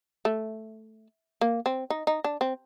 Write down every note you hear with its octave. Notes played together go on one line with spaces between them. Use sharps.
A3
A#3
C4
D#4
D#4
D4
C4